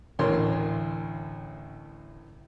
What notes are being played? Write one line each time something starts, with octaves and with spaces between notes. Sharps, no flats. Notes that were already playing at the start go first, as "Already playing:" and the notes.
A1 D2 A2 A#4 C#5 C6